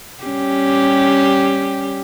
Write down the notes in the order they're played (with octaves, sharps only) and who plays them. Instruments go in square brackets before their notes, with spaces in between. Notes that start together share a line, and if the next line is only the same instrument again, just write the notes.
[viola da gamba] G3 C#4 G4